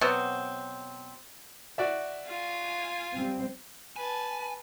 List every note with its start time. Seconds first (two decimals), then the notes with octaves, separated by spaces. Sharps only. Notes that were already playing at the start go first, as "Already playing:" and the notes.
0.01 B2 F#3 C4
1.78 F#4 D5 E5
2.27 F4 G#5
3.16 G3 C4
3.96 B4 G#5 A5